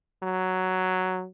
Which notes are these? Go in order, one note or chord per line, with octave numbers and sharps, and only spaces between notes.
F#3